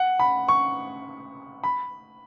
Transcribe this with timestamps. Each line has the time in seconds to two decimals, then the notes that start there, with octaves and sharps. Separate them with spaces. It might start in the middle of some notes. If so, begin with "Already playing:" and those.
Already playing: F#5
0.20 B5
0.48 C#6
1.64 B5